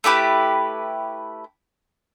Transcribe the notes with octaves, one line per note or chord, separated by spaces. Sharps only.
A3 E4 G4 B4